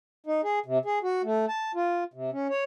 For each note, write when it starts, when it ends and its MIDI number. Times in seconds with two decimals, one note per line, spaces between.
0.26 0.41 63
0.44 0.59 68
0.66 0.78 48
0.85 0.99 68
1.03 1.22 66
1.24 1.46 57
1.49 1.72 81
1.75 2.04 65
2.14 2.30 48
2.32 2.47 61
2.50 2.64 73